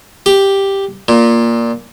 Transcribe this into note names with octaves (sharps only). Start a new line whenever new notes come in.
G4
A#2